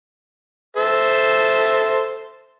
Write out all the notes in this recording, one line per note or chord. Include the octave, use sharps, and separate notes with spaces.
A4 C5 E5